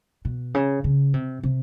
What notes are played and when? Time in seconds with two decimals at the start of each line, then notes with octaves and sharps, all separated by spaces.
0.25 B2
0.54 C#3
0.84 C#3
1.14 C3
1.43 C3